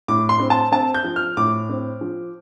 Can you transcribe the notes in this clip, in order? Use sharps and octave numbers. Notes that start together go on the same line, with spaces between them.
A2 D6
C6
C4
A5
C4 A5
G6
F3
F6
A2 D6
C4
F3